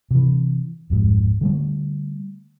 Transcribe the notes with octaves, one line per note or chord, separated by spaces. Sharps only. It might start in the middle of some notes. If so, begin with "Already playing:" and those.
C3 E3
D1 F2 G#2
D3 G3 A3